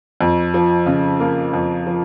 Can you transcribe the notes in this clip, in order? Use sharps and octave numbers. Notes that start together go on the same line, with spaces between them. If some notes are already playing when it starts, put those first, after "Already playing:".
F2
F3
C#3
A#3
F2
F3